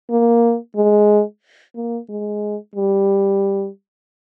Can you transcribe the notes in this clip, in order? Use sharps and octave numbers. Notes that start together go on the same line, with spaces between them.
A#3
G#3
A#3
G#3
G3